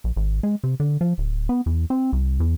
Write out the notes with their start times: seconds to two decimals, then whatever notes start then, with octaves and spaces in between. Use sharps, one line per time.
0.04 A#1
0.16 G#1
0.43 G#3
0.64 C3
0.80 D3
1.01 F3
1.18 D1
1.49 B3
1.66 E2
1.90 C4
2.13 C2
2.40 E2